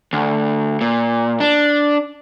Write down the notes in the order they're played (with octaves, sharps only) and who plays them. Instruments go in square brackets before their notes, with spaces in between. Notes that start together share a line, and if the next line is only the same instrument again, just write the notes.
[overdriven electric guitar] D2
A#2
D4